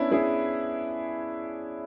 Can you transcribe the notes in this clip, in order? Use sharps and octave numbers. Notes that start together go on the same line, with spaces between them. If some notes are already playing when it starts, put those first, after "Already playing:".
Already playing: B3 C#4 D4 E4
E4 G#4